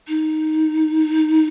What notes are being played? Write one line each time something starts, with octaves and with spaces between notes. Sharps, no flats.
D#4